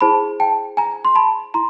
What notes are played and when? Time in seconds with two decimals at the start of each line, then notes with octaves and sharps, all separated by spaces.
0.01 E4 G#4 C5 A5 B5
0.40 G5 A5
0.77 G#5 A#5
1.05 C6
1.15 A5 B5
1.54 E4 A#5 C6